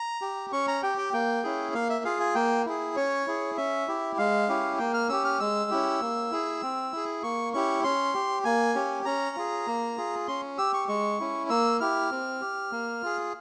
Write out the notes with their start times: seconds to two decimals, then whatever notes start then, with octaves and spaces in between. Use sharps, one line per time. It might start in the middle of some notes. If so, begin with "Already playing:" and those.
Already playing: A#5
0.21 G4
0.52 C#4 C#6
0.68 A#5
0.83 G4 G5
0.98 G5
1.13 A#3 G5
1.44 C#4 E4 G#4
1.74 A#3 F5
1.90 E5
2.04 F4 G#4 F5
2.20 G#5
2.35 A#3 G5
2.66 E4 G#4
2.96 C#4 C#5
3.27 E4 G#4
3.57 C#4 E5
3.88 E4 G4
4.18 G#3 F5
4.48 C#4 E4 G4
4.78 A#3 G5
4.94 F6
5.09 C#4 G4 E6
5.25 F6
5.40 G#3 E6
5.71 C#4 E4 G4
6.01 A#3
6.31 E4 G#4
6.62 C4
6.92 E4 G#4
7.23 A#3 C#6
7.53 C#4 E4 G4 C#6
7.84 C#4 C6
8.14 G4
8.45 A#3 G#5
8.75 C#4 G4
9.05 C#4 A#5
9.36 F4 G#4
9.67 A#3
9.97 F4 G#4
10.28 C#4 C6
10.58 G4 E6
10.74 C#6
10.88 G#3 C#6
11.20 C#4 E4
11.49 A#3 E6
11.80 E4 G4 F6
12.11 C4
12.41 G4
12.72 A#3
13.02 F4 G#4